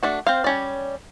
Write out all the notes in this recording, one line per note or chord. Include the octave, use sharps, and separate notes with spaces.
A3 D4 F#4
C4 C5 F5
G3 C#4 D5